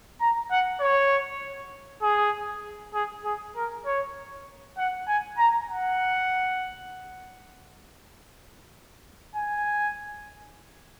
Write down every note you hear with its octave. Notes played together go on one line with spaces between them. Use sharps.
A#5
F#5
C#5
G#4
G#4
G#4
A#4
C#5
F#5
G#5
A#5
F#5
G#5